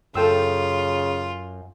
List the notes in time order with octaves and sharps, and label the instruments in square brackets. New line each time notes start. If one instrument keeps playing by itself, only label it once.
[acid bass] F#2 [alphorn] C#3 [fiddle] F4 [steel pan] A4 G5 E6